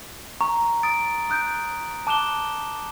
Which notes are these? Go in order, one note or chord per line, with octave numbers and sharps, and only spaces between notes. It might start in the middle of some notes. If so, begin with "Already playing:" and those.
A#5 C#6
D#6 A6 D7
D#6 F#6 G6 D7
A5 D6 F#6 E7 G7